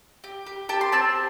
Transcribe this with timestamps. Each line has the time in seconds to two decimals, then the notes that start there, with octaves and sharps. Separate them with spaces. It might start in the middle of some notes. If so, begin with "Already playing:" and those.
0.24 G4
0.47 G4
0.69 G4 A5
0.81 C6
0.92 C4 A5